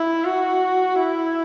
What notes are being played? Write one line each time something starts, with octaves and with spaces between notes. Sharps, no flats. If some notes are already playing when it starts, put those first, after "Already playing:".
Already playing: E4
F#4
E4